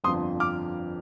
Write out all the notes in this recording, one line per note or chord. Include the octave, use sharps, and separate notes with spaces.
G1 F2 D3 F3 C6 D#6
D6 F6